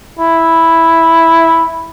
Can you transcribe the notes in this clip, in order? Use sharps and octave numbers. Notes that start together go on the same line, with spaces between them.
E4